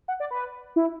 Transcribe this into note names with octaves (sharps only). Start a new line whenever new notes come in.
F#5
D5
B4
E4